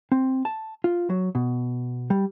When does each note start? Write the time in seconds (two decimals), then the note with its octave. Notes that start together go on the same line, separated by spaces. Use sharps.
0.12 C4
0.45 A5
0.84 F4
1.10 F#3
1.35 B2
2.10 G3